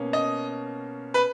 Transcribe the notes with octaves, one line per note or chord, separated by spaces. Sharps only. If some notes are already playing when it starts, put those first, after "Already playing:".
Already playing: B2 A#3 C#4
D#5
B4